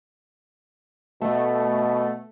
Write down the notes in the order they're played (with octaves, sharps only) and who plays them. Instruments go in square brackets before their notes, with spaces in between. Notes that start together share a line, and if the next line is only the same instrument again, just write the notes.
[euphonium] B2 [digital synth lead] A3